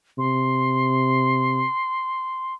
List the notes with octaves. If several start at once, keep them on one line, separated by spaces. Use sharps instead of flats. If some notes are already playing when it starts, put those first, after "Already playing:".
C3 C6